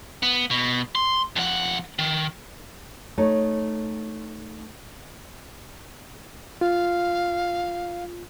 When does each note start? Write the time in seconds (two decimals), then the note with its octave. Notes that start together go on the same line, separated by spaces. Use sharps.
0.23 B3
0.51 B2
0.95 C6
1.36 F2 F#5
1.99 D#3
3.18 A3 D#4 C#5
6.61 F4 F5